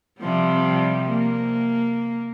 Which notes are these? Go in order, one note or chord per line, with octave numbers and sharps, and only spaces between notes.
C3 F3 G3
A#3